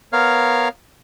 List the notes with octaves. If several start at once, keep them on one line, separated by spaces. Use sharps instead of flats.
B3 A#4 C#5 F5 F6